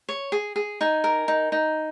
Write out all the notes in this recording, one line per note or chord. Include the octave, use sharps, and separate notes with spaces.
C#5
G#4
G#4
D#4 G#5
A#4
D#4
D#4